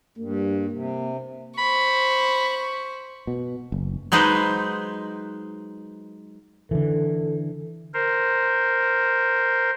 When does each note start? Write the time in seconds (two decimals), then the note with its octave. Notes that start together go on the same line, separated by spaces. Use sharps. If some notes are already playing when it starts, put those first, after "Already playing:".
0.18 G2 A#3
0.72 C3
1.58 C5 B5 C#6
3.27 B2
3.72 F#1
4.12 F#3 G#3 D#4 B4 C5
6.71 D3 E3 A4
7.94 A#4 C5